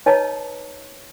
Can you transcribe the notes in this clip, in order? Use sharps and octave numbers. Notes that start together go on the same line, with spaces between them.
D#4 B4 C#5 D#5 A5 A#5